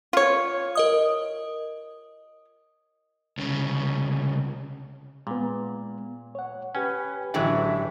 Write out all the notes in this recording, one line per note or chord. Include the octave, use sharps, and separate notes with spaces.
F4 C#5
A#4 D#5 D#6
C2 C#3
A#2 G#3 B3
C#5 F#5
C#4 G4 B4 G5 G#5
A1 D3 E3 F#3 G#3 D5 E5 G5